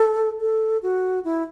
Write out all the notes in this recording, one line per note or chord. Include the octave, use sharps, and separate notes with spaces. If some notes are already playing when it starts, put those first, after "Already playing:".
Already playing: A4
A4
F#4
E4